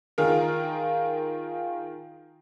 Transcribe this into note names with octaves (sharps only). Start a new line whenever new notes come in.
D#3 F4 G#4 A#4